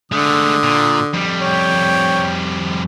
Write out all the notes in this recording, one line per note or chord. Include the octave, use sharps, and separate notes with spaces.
D3 G#3 A3 D#6
A#2
F2 G3
C#5 G5